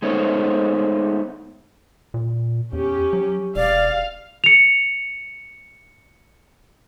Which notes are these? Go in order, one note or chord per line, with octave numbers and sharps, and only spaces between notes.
G#3 A3 B3 D#4 C5 C#5
A#2
E2 C#4 G4
F#3
E1 D5 F5
C#7 F7